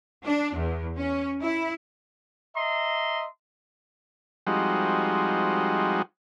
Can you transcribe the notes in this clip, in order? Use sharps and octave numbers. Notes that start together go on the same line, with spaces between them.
D4
E2
C#4
E4
D#5 E5 A#5 C6
F3 G3 G#3 C4 D#4 F#4